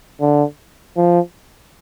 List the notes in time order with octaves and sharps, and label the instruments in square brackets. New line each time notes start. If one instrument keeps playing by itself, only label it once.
[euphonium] D3
F3